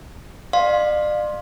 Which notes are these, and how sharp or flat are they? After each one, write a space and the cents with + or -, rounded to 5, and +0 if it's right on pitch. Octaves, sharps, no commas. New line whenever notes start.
D5 +40 F5 +10 C6 +10